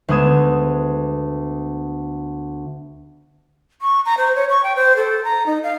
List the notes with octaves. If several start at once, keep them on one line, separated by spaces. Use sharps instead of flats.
D2 G#3 B3 D#6 G#6 E7
C#6
A#5
C5
C#5
C#6
G5
C5
A4
A#5
D#4
F5